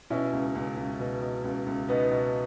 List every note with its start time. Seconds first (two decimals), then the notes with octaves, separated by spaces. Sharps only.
0.10 B2 C#4 E4
0.33 C#2
0.55 C#2
0.77 C#2
1.00 B2
1.21 B2
1.44 C#2
1.66 C#2
1.89 B2 B3 D#4
2.11 B2